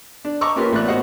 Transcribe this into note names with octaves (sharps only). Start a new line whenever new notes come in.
D4
D#5 A5 A#5 C#6 D6 E6
A#3 C#4 F4 G4 A#4 B4
A1 A3 B3 A4 D5 F#6
B3 F#4 C5 D#5 F5 F#5